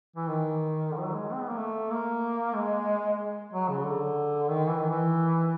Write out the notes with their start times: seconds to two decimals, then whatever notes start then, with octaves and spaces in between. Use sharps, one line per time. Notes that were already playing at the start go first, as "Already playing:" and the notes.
0.16 E3
0.28 D#3
0.92 D3
0.97 F3
1.04 F#3
1.14 G#3
1.33 C4
1.41 B3
1.49 A#3
1.57 A3
1.91 A#3
2.55 G#3
3.53 F#3
3.69 C#3
3.86 D3
4.51 D#3
4.67 E3
4.79 D#3
4.90 E3